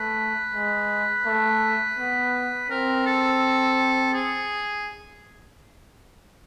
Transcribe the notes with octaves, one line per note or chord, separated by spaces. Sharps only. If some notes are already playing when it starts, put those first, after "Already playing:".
Already playing: A3 B4
G#3
A3
B3
C4 A#4
A4
G#4